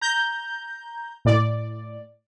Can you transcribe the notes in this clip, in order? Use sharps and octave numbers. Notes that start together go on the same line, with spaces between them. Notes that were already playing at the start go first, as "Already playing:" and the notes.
A#5 G6
A2 D5